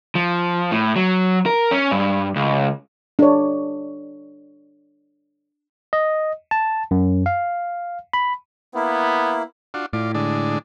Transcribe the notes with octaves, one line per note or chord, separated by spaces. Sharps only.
F3
A2
F#3
A#4
C#4
G2
C#2
D4 C#5
D#5
A5
F#2
F5
B5
A#3 B3 E4
D4 F4 F#4
A2 F4 D5
D3 G#3 D4